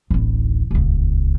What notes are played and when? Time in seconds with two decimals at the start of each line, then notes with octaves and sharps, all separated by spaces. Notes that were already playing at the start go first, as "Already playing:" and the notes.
0.11 D1 A1
0.71 D#1 C#2